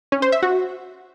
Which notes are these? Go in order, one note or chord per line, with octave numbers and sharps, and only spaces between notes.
C#4
C5
E5
F#4